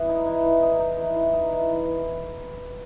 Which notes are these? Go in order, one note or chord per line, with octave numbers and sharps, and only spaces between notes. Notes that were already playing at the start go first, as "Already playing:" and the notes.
Already playing: E3 B3
D#4
E3
E3
D#4
D#4
E3
E3
D#4
E3
E3
E3